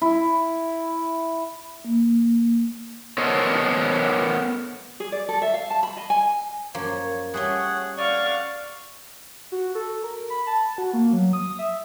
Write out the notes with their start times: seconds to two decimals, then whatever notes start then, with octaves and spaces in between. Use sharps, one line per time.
0.01 E4
1.85 A#3
3.18 B3 A4 A#4 C5 C#5 D#5
5.00 G#4
5.12 D5
5.29 A4
5.42 E5
5.54 F5
5.70 A5
5.83 B5
5.97 D#5
6.10 G#5
6.74 F#2 F3 A#3 C#5
7.34 G3 A3 C#4 G#4 C#5 F#5
7.98 D5 F5 F#5 G#5 C#6
9.52 F#4
9.75 A4
10.03 A#4
10.30 B5
10.47 A5
10.78 F#4
10.93 A#3
11.13 F#3
11.33 D#6
11.59 E5